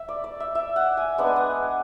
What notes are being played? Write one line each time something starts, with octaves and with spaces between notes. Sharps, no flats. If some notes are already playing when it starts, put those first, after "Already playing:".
Already playing: E5
D5
D5
E5
E5
F#5
G#5
G#3 B3 D4 F#5
G#5
F#5